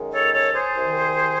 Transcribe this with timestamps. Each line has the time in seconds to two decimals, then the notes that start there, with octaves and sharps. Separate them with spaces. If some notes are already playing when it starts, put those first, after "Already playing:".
Already playing: F#2 D#3 G#3
0.12 A4 C#5
0.33 A4 C#5
0.54 G#4 C5
0.75 C2 C3 D#3